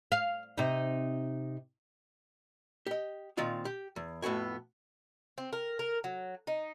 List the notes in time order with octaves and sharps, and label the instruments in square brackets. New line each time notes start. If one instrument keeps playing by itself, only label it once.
[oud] F5
C3 D#4
[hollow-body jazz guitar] G4 D#5
A#2 D#3 C4 F4 F5
G4
E2
F2 A2 B3 F#4 G#5
[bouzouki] C4
A#4
A#4
F#3
D#4